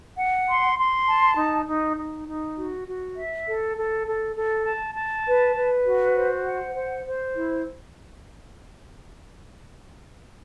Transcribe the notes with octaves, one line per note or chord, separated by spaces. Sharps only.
F#5
C6
C6
A5
D#4
D#4
D#4
D#4
F#4
F#4
E5
A4
A4
A4
A4
A5
A5
B4
B4
F#4
C5
F#5
C5
C5
E4